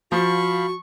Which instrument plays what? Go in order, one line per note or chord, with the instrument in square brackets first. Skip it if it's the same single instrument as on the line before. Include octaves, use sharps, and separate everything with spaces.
[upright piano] F3 [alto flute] F#4 [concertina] F5 B5 [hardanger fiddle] C#6